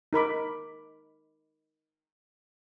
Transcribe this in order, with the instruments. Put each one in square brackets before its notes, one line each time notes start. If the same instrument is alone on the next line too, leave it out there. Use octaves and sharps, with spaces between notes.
[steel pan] D#4 A#4 B5 D6